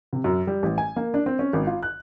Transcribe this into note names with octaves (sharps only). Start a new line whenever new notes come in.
C3
F#2
G3
A1
G#5
A#3
D4
C4
C#4
G#1
F4
F#6